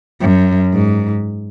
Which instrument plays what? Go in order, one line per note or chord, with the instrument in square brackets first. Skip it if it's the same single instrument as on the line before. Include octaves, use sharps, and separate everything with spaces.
[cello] F#2
G#2